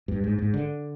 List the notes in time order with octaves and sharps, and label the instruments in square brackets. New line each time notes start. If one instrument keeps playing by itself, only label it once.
[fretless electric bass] G2
G#2
G#2
D3